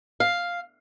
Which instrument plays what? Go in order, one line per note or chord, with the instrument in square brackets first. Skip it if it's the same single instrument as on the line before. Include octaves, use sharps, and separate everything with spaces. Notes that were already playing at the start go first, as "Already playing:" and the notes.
[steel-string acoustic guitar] F5